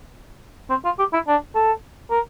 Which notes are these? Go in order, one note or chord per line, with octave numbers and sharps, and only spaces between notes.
C4
F4
G4
E4
D4
A4
A#4